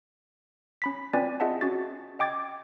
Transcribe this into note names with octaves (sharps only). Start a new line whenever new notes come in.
C#4 B5 B6
C4 C#4 F4 B4 D5 G#5
F4 G#4 D#5 E5 F#5 A5
C#4 F#4 A6
D#5 G5 D6 G#6 A6